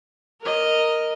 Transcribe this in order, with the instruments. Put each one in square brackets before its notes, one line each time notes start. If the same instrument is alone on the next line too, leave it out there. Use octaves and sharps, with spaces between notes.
[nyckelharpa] A#4 D#5